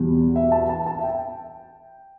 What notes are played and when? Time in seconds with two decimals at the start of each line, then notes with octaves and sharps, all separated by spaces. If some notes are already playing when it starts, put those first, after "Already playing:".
Already playing: E2 B2 G3
0.36 E5
0.52 A5
0.69 A5
0.86 A5
0.99 E5
1.03 G5